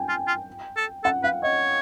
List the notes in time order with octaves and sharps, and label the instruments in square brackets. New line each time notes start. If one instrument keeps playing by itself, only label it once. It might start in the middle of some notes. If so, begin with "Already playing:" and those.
Already playing: [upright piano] G5 G#5
[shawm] F4
F4
A4
[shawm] A4 [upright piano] F#5
[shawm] B4 [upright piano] F5
[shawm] C#5 [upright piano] D#5